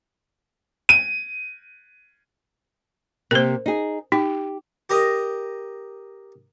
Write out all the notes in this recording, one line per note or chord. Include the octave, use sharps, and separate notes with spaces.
D#7
C3 A#3 A#4 C5
D#4 G#4
D#4 G4
G4 A#4 D#5